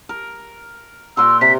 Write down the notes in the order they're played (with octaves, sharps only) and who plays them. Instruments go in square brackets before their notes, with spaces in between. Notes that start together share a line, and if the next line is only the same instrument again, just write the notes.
[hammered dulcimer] A#4
[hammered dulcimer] A#2 A#4 C6 [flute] E6
[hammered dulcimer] C3 A#5 [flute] B6